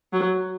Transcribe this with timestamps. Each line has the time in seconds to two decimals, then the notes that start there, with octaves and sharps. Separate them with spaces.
0.13 F#3